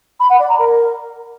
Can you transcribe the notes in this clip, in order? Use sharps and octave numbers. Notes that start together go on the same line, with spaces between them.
B5
F#5
D5
A#5
A#4